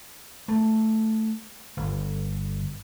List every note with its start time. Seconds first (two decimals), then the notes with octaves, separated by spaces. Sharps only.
0.48 A3
1.77 G1